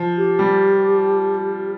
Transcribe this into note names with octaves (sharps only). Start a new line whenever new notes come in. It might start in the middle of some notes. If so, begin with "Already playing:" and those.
Already playing: F3
G4
G3